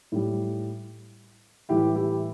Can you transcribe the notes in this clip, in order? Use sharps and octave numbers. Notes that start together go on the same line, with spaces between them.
A2 G3
A2 E3 G3 E4 G4
E4 G4